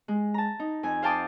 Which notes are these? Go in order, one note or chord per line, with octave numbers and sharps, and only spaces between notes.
G#3
A5 A#5
D#4
F2 G#5
C5 F5 G5 A5 D6 D#6